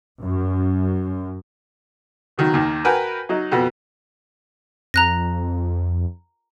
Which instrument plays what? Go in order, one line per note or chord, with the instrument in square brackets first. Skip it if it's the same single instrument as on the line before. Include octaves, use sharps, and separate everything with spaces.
[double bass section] F#2
[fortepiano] B2 D#3 F#3
D#2 D#3
F#4 A#4 B4 G5 G#5
F#3 D#4
F2 B2 B3
[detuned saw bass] F2 [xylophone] A#5 F#6 A#6